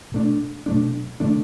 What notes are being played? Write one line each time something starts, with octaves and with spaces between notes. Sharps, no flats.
B2 A3 D4
B2 F#3 A3 D4
C#3 E3 A3 D4